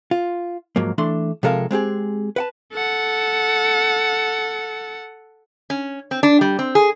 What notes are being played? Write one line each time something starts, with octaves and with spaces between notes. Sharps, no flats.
F4
G#2 F3 F#3 A#3
E3 A3 D4 C6
C3 F3 G#3 A4 A#4 F5
G#3 C4 G4 G#4
B4 F#5 A5
A4 F#5
C#4
C4
D4
G3
C4
G#4